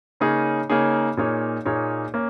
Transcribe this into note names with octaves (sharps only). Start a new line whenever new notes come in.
C#3 A#3 D#4 G#4 C#5
C#3 A#3 D#4 G#4 C#5
A#2 A#3 D#4 G#4 C#5
A#2 A#3 D#4 G#4 C#5
A#3 C#4